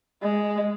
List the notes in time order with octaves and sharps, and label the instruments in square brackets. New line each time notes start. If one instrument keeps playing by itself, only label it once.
[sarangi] G#3